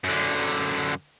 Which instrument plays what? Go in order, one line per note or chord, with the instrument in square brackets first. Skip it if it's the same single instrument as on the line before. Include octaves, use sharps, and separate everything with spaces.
[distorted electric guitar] F#2 D3